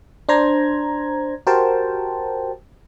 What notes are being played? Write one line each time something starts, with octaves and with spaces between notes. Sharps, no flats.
D4 C5 A#5 G#6
F#4 G4 A#4 C5 G5 A5